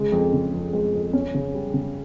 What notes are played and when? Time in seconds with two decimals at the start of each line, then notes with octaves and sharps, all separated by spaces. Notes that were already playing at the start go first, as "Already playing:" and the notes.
Already playing: C#3 G#3
0.12 F2
0.33 C#3
0.53 F2
0.73 G#3
0.94 F2
1.13 C#4
1.34 C#3
1.54 G3
1.74 C#3